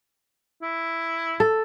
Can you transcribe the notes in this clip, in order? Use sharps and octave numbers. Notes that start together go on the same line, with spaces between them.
E4
A4